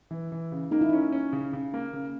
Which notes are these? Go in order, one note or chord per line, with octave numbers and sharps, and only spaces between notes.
E3
E3
C#3
A#3 D#4
E4
C#4 D#4
C#4
C#3
C#3
A#3
C#3